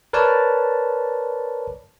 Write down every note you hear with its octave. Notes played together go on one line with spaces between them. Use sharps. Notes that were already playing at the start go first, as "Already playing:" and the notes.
A#4 B4 C#5 D5 A5